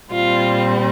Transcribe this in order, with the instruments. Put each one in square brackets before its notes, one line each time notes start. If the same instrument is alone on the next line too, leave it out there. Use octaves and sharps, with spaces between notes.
[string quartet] A#2 G3 C4 F4